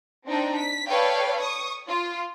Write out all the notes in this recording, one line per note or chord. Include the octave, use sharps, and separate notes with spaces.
C4 D4 D#4 G5
B6
A4 B4 C#5 D5 F5 G5
C#6 D#6
F4